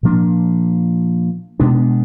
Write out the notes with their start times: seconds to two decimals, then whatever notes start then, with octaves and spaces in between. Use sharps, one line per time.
0.03 A#2 F3 A#3 D4
1.60 B2 G#3 B3 D4